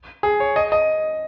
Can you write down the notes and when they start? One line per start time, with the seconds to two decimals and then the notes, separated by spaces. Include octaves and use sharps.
0.23 G#4
0.40 C#5
0.56 D#5
0.72 D#5